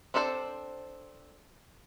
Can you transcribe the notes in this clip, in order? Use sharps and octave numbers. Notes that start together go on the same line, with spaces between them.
C4 D4 A4 A#4 C5